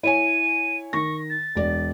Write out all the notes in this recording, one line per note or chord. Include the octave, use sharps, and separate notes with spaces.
E4 C#5 G#5 D#7
D#3 C#6 A#6
A6
E1 D5